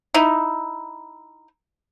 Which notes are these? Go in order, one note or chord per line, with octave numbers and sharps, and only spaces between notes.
D#4 E4